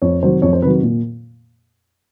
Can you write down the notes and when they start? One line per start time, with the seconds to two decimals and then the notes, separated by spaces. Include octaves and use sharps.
0.02 F2 C#5
0.23 C3 D#3 F#3 C5
0.42 F2 C#5
0.53 C5
0.62 C3 D#3 F#3 B4
0.83 A#2